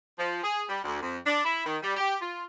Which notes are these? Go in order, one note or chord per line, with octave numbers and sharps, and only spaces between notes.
F3
G#4
G3
D2
F2
D4
E4
D#3
G3
G4
F4